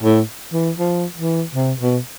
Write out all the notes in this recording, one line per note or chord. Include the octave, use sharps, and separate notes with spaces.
A2
E3
F3
E3
C3
B2